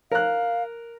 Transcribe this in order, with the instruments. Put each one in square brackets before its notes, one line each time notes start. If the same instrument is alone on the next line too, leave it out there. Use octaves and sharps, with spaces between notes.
[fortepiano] A#4 F#6 [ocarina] F5